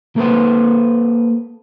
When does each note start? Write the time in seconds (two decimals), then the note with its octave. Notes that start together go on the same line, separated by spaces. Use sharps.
0.16 A#3 A4 B4 C5